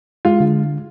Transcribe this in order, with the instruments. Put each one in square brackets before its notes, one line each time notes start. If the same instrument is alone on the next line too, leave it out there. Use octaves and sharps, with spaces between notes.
[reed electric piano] G#3 [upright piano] F4
[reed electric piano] D3